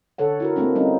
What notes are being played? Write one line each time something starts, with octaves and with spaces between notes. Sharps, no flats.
D3 A4 C#5 F#5
E4 F#4 A#4
A3 A#3 C4 D4
G3 C4 C#4 D#4